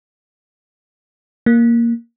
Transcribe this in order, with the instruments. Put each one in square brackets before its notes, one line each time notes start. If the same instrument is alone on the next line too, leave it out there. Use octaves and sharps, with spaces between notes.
[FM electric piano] A#3